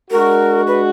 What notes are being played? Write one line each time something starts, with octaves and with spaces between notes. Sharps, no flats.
G#3 D4 F#4 A#4
B4